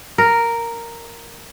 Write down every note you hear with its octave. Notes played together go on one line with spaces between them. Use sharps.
A#4